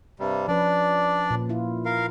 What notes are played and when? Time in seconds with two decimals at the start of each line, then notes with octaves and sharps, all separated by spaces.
0.20 G2 C3 G3
0.48 F3 C#4 D4 B4 D5
1.30 A#2
1.49 E4 F4
1.85 A#4 F5